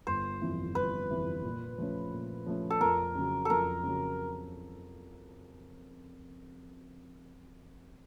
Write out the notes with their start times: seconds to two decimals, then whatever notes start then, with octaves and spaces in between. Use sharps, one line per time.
0.07 G1 C5
0.42 F2 C3 E3
0.75 G1 B4
1.10 F2 C3 E3
1.44 A#2
1.78 F3 A3 C#4
2.13 A#2
2.46 F3 A3 C#4
2.70 A4
2.81 F2 A#4
3.15 C#3 F#3
3.45 F2 A4 A#4
3.83 C#3 F#3